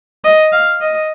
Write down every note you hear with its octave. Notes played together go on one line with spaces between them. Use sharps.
D#5
F5
D#5